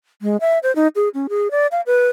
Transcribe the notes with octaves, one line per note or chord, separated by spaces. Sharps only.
G#3
E5
C5
D#4
G#4
C#4
G#4
D5
F5
B4